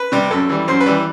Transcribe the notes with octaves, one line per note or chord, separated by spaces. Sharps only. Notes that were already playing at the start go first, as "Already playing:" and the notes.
Already playing: B4
C3 G3
F#2 A4
E3 G3
F#2 C5
B4
E3 G3